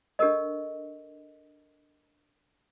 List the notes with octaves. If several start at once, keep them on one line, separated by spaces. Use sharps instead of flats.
D4 G4 A4 A#4 D#5